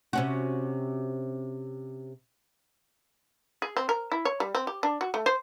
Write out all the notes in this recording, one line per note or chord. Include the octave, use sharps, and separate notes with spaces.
C3 C#4 F#4
G#4
C4
A#4
E4
C#5
G3
C4
G4
D4
F#4
A3
C5